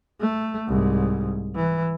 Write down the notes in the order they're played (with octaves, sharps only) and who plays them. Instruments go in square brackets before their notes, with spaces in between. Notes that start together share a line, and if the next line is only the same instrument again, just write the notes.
[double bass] A3
C2 G#2
E3